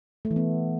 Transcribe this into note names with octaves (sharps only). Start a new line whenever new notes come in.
A3
E3
B3